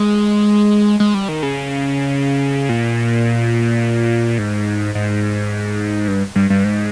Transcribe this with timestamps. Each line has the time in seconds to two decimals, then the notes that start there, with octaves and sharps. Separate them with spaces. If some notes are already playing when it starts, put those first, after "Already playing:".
Already playing: G#3
1.00 G#3
1.14 G3
1.28 D#3
1.43 C#3
2.69 A#2
4.38 G#2
4.95 G#2
6.08 G2
6.35 G2
6.50 G2
6.64 G#2